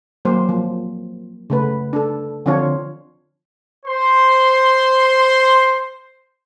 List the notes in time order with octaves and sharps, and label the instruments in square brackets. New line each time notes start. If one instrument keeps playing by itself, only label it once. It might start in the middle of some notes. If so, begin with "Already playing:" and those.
[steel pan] F#3 A#3 C5
F3
C#3 A3 B4
D4 A4
D3 F3 C4 D4 F4 C#5
[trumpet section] C5 C6